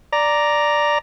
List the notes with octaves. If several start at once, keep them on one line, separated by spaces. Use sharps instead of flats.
D5 A#5